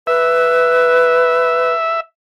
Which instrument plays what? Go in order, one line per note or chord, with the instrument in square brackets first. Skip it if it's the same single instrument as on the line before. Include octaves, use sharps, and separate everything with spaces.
[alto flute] B4 [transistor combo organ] E5